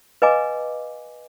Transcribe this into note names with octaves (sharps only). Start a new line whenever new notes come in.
B4 D#5 F5 G#5 A#5 D6